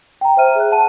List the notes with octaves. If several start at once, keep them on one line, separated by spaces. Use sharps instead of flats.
G5 A#5
C5 E5 F6 D#7
G#4 F#6
F#5 A5 D#7